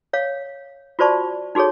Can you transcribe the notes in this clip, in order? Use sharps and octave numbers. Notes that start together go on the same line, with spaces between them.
C#5 F5
F4 F#4 C5 D5 A5 C#6
D#4 F#4 G#4 A4 C#5